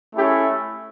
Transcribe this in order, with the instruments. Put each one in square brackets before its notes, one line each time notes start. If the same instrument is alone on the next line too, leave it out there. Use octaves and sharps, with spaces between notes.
[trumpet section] A3 C#4 E4 G4